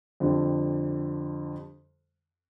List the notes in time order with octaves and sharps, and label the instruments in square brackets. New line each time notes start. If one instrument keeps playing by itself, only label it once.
[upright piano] F2 D3 G3